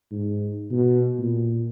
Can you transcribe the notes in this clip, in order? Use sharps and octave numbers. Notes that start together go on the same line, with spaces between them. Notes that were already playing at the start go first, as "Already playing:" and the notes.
G#2
B2
A#2